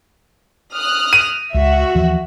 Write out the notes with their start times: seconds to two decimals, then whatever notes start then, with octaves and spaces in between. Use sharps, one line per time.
0.74 D#6 F6 F#6
1.13 D#7
1.54 C#2 F#4 E5
1.95 D#2 E3 F3